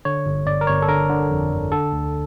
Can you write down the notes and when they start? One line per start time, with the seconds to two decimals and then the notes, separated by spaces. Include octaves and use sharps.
0.05 D3 C#5
0.26 G1
0.47 G1 D5
0.61 A#4
0.67 G1 C#5
0.82 A4
0.88 D3 A#4
1.09 D3
1.31 F2
1.51 G1
1.72 D3 A4
1.92 D2